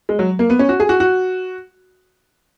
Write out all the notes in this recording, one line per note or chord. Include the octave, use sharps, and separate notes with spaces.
G#3
F#3
A#3
B3
C#4
F#4
G#4
F#4
F#4